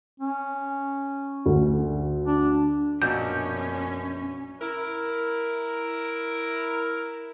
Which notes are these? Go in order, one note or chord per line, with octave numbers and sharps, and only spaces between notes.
C#4
D2
D4
A#1 F#2 B2 C#4 D4 G6
E4 A#4